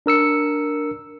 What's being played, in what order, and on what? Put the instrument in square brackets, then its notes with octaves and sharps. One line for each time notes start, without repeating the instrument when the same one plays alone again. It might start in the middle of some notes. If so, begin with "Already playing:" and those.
[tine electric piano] D4 A#4 E6 C#7